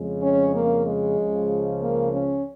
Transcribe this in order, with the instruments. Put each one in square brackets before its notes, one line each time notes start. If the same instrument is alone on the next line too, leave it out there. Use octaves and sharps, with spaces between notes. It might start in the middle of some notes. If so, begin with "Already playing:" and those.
Already playing: [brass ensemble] F2 C#3 G#3
C#4
A#3
G#3
C#2 C#3 F3
A#3
C#4